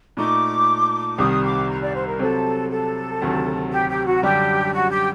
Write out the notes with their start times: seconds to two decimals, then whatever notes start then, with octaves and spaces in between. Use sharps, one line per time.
0.17 A#2 A3 D#4 D6
1.18 C2 C3 D#3 G3 D#6
1.43 D6
1.68 A#5
1.82 D5
1.94 C5
2.07 A#4
2.19 C3 F#3 C4 A4
2.70 A4
3.22 D2 C3 D#3 F#3
3.71 G4
3.89 G4
4.06 F#4
4.23 F#2 D3 G3 D4 G4
4.73 F#4
4.90 G4